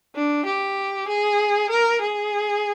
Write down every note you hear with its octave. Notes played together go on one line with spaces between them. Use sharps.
D4
G4
G#4
A#4
G#4